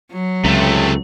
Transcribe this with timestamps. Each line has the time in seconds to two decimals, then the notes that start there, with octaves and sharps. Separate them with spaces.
0.11 F#3
0.45 C#2 C3 A3